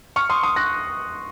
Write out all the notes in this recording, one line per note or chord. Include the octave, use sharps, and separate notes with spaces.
C#6 F6
C6 D#6
C6 D#6
F#6 A#6